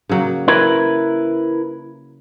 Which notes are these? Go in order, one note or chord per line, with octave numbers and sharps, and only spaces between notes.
C#3 F#3 A#3
E4 A#4 B4